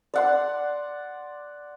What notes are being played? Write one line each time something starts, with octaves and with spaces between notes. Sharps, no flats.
D5 F#5 C6